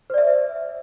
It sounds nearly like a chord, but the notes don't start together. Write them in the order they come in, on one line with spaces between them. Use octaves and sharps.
C5 D5 E5